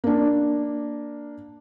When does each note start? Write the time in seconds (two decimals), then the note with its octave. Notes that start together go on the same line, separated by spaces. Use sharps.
0.04 A#3 D4